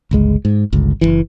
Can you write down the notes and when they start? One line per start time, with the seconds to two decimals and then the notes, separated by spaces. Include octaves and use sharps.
0.11 G1 C#2 G#3
0.45 G#2
0.73 G1 C#2
1.01 F#1 B1 E3